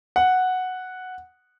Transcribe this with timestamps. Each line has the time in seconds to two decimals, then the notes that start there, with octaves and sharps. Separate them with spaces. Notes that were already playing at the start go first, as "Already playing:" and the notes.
0.16 F#5